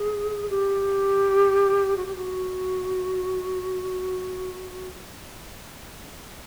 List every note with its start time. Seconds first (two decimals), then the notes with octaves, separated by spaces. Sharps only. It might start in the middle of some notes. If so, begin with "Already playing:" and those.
Already playing: G#4
0.49 G4
1.97 F#4
2.06 G4
2.16 F#4